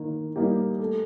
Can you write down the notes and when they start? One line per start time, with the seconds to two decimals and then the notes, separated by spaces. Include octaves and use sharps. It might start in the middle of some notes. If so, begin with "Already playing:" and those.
Already playing: D#3 A#3
0.36 G3 A#3 D#4 G4
0.80 A3